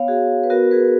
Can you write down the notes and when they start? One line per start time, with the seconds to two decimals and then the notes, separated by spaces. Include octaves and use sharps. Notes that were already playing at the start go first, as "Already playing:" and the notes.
Already playing: B3 C#5 F5
0.08 F#4 G#4
0.44 B4
0.50 B3 F#4 A#4
0.71 G#4 B4